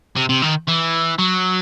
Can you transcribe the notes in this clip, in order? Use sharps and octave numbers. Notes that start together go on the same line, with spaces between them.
C3
C3
D#3
E3
F#3